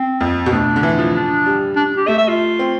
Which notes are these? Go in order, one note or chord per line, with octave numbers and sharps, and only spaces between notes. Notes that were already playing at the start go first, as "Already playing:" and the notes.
Already playing: C4
F2
B2
A2 D4
D3
E3
F3
D4
G3
D4
G4
A3 E5
E5
F4
C4